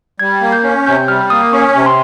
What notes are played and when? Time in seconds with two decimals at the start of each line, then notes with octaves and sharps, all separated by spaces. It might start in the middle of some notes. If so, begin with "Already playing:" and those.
0.19 G3 G#6
0.41 A#3
0.52 G6
0.63 C#4
0.86 C3 G6
1.08 G3 F6
1.30 A#3 D#6
1.53 C#4 C#6
1.74 C3
1.86 C6